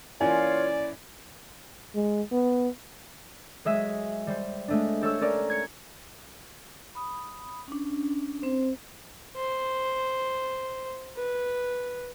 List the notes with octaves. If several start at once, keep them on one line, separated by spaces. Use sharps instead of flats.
E3 A#3 C#4 F4 C#5 D5 G#5
G#3
B3
F#3 G#3 G#4 E5
G3 C5
G#3 A3 D4
G4 A4 C#5 E6
C#4 A4 A#4 D5
G#6 C#7
B5 D#6
C#4 D4
C4 C5
C5
B4